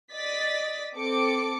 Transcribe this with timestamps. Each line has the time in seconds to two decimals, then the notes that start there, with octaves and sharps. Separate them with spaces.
0.13 D5 D#5 A6 B6
0.97 C4 A4 D6 C#7